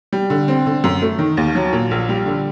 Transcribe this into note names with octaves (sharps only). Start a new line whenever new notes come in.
G3
D3
C4
D3
F#2
A3
D#3
D#2
F#3
A#2
A#1
G3
D3